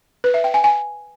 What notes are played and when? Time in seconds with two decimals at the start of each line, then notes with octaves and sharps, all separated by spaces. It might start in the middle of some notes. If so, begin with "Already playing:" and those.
0.24 B4
0.34 E5
0.44 G5
0.54 G#5
0.64 G#5